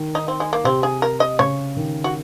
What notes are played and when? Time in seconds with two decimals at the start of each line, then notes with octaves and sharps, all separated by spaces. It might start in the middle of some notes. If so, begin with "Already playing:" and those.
Already playing: D#3
0.15 D#4
0.28 C4
0.40 G#3
0.53 A#3
0.64 C3 C4
0.83 G#4
1.02 A#4
1.20 D#5
1.39 C#3 C#5
1.76 D#3
2.04 F#4